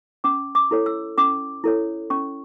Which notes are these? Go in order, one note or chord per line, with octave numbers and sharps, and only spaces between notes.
C#4 D6
D6
E4 A4 C#5
E6
C#4 D6
E4 A4 C#5
C#4 C#6